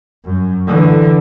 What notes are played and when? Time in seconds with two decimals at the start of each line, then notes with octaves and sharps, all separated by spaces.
0.25 F#2
0.67 D3 E3